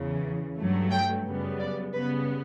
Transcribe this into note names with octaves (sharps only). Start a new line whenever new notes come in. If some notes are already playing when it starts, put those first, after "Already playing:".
Already playing: E2 C#3 E3
G2 F#3 A3
G5
F#2 C#3 G3 B3
D5
C#3 G3 B3 B4